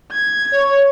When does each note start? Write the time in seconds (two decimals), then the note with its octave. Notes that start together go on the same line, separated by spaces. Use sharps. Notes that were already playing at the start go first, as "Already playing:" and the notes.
0.12 G#6
0.52 C#5